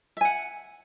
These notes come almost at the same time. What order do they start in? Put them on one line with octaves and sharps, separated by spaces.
E5 G#5 F#5